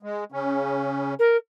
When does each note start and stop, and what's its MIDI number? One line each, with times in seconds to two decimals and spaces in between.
0.03 0.24 56
0.32 1.14 49
0.32 1.14 61
1.19 1.37 70